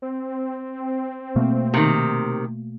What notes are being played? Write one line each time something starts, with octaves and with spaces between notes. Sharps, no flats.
C4
B2 A3 A#3
C3 D#3